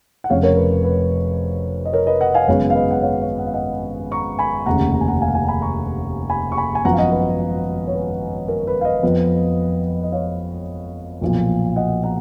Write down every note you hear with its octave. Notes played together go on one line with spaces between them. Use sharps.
F#5
F1 F2 C#3 C#5 F5
A#4 C#5
B4
A#4
B4
D#5
A#4 C#5
B4 D#5
D#5 F#5
F5 G#5
G#1 F#2 C#3 G#3 B3 C#5 F5
F5
B4 D#5
F#5
C#5 F5
C#5 F5
F#5
F5
D#5 F#5
A#5 C#6
G#5 B5
F1 D#2 C#3 F#5 A#5
A#5
G#5
F#5 A#5
F5 G#5
F#5
F5 G#5
A#5
G#5 B5
A#5 C#6
G#5 B5
C#6
G#5 B5
G#5
G#1 F#2 F3 B3 F#5 A#5
F5
D#5 F#5
B4 D#5
C#5
B4
A#4
B4
F5
B4 D#5
F2 F3 B3
D#5
C#5 F5
B1 A#2 F3
D#5 F#5
F#5 A#5